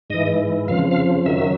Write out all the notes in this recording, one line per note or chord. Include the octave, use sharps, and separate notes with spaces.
G#2 E3 D#5
F2 C#3 F3 F5
F5
F#2 D#3 F#3 E5